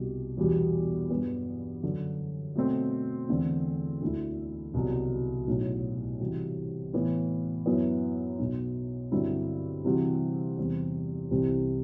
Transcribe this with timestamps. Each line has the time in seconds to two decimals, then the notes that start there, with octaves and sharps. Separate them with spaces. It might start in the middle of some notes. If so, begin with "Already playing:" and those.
Already playing: C2 B2 G3
0.37 E2 B2 G3
1.10 G2 F#3 B3
1.83 F#2 D3 F#3
2.55 B2 F#3 A3 C4
3.28 E2 D3 A3 C4
4.02 D2 D3 A3 E4
4.74 C2 B2 F#3
5.47 B1 A2 F#3
6.20 C3 E3 G3 C4 F#4
6.93 A2 E3 B3
7.66 F#2 F#3 B3 E4
8.39 B1 B2 F#3
9.12 G2 D3 F#3 C4 E4
9.85 C3 E3 G3 C4 F#4
10.58 E2 C3 G3 C4
11.31 C2 C3 E3 G3 C4